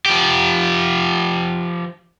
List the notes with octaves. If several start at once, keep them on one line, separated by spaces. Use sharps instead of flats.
F3 G4